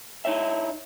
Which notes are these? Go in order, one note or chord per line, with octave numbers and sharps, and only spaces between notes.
D#4 E4 C#5 E5